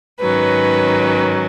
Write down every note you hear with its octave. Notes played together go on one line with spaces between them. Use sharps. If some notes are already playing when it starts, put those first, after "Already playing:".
G#2 D#3 F#3 C#4 B4